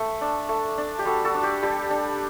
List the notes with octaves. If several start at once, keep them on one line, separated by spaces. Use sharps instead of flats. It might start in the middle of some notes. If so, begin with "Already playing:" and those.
Already playing: A3
D4
A3
D4
G4
G3 F#4 A4
F#4 A4
D4
G4
G3 G4
D4